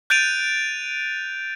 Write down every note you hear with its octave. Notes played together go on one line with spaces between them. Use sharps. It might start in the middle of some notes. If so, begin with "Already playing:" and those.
F#6 G6 A6 D7 D#7 F7